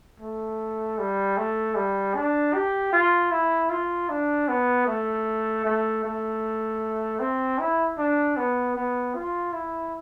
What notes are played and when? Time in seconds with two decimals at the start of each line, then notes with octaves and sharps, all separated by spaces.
0.20 A3
0.98 G3
1.37 A3
1.75 G3
2.15 D4
2.54 G4
2.92 F4
3.31 E4
3.70 F4
4.09 D4
4.48 B3
4.87 A3
5.65 A3
6.04 A3
7.19 C4
7.59 E4
7.98 D4
8.37 B3
8.75 B3
9.15 F4
9.53 E4